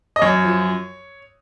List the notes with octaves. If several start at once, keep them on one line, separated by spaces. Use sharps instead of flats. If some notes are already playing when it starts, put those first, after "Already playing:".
D#5
F#2 C#5
F3